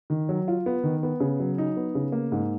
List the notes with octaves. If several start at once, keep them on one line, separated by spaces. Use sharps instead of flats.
D#3
F#3
F4
B3
D#3
B3
C#3
F#3
D#4
B3
C#3
A#3
G#2